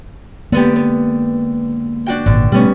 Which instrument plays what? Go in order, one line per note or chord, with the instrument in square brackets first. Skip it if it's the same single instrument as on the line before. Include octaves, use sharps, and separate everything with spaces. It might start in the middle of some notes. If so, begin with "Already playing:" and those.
[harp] D3 B3 G4 [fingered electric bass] G#3 A#3
[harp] B3
D4 F#4 G5
[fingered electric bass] G#1 A#2 [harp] D3
[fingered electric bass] B2 A3 [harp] G3 B3 C#4